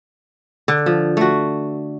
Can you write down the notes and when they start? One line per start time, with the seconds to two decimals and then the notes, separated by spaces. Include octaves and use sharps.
0.68 D3
0.86 F3
1.17 A3 F#4